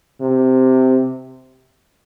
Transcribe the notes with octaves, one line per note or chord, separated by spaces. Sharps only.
C3